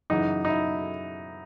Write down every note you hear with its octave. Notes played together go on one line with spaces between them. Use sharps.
F#2 C#3 E3 D#4
D#4
E4